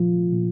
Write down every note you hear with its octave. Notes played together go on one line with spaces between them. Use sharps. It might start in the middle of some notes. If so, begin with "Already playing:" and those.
Already playing: A#2 F3 F4
A#2